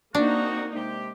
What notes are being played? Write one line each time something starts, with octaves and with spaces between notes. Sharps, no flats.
A#3 C4 D4 D#4 F#4
C3 G#3 G4